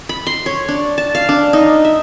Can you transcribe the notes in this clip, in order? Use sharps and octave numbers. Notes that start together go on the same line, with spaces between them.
B5
C6
C#5
D4
A5
F5
D4
D#4
E5